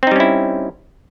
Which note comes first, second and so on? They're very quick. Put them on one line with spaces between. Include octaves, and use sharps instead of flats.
C4 D#4 G3 C#4 E4